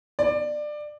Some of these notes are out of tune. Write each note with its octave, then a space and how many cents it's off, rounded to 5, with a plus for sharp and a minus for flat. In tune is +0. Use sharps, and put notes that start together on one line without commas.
D5 +20